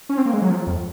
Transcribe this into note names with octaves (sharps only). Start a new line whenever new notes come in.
C#4
C4
A#3
G#3
F#3
F3
F2